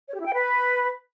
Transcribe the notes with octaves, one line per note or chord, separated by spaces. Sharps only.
C#5
G4
E4
G5
B4